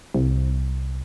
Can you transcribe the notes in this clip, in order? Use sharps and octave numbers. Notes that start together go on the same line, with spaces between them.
C2